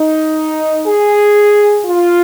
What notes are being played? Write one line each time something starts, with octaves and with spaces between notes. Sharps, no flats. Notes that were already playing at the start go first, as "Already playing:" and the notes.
Already playing: D#4
G#4
F4